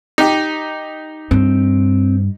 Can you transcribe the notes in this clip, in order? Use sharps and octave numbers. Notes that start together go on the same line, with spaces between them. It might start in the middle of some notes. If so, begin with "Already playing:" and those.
D#4 G4
G2 C4